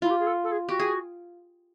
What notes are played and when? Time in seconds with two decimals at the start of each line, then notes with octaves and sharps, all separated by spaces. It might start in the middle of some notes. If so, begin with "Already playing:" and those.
0.02 E4 F4
0.10 G4
0.19 G#4
0.26 A4
0.43 A4
0.51 G#4
0.68 F#4 G4
0.80 G#4